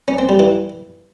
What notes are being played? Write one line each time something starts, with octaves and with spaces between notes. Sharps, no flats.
C#4
C4
G3
E3